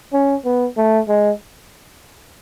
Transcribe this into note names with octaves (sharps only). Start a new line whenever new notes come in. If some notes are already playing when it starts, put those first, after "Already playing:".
C#4
B3
A3
G#3